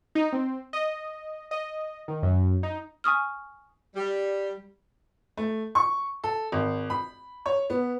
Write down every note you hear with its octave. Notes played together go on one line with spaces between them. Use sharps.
D#4
C4
D#5
D#5
D#3
F#2
D#4
G#5 C#6 D#6 F6
G3
A3
C#6
A4
G#1
B5
C#5
B3